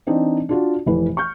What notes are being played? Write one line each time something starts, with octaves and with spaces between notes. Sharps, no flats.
E3 C4 D4 D#4
D4 F4 F#4
F1 E3 B4
C#6 F6 G6